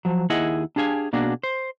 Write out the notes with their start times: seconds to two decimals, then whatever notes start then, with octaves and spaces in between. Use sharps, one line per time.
0.05 F3 F#3
0.30 D#2 E4 G#4 D#5 F#5
0.76 D4 G4 G#4 F5 G#5
1.13 B2 A#3 D4 F#4 G#4
1.43 C5